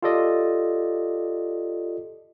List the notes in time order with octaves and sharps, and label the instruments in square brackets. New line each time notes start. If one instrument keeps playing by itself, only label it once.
[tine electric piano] F4 G4 A4 D5 D#5